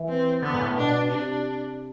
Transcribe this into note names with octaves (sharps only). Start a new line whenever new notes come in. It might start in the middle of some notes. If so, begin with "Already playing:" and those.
Already playing: E3
C4
D3 B3
G#2
A2
B2 D4
C3 D4